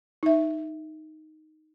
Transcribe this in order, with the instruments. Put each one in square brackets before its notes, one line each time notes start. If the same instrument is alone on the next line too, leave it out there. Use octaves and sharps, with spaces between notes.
[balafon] D#4 E5